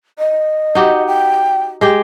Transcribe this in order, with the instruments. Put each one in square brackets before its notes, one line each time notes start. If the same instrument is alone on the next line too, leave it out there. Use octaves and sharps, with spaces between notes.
[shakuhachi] D#5
[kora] D#4 F#4 G4
[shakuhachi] G5
[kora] G#3 G4 G5